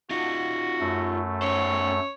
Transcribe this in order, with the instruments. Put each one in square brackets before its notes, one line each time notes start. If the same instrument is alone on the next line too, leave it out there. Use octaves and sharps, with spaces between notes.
[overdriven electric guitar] D#4 F4 [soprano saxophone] F#4
[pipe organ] F#2 A3
[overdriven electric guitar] C#4 C5 [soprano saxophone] C#5